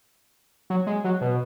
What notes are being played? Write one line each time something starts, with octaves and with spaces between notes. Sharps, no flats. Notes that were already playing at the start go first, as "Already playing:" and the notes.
F#3
G#3
F#3
B2